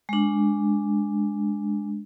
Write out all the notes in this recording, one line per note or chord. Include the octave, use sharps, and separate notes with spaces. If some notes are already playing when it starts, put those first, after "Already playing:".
G#3 D4